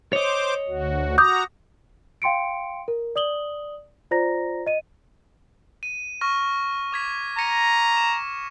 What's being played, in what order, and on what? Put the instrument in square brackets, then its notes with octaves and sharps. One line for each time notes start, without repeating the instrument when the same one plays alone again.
[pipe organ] C5 D6 [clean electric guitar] C#5 D#5
[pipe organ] D2 F#4
[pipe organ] F#4 A#5 [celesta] D6 D#6 G6
[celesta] F5 G5 C6 C#7 D7
A#4
D5 D#6 F#7 G7
F4 C5 D5 A#5 A#6
D#5 D#7
[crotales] D#7
C#6 F6 A#6
D6 G#6 B6
[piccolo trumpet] A#5 [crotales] A#6 C#7 D#7
[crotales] E7